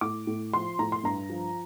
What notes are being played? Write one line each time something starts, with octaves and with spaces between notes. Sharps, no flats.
A2 D6
A2
F3 C6
A2 A#5
C6
G2 A#5
F3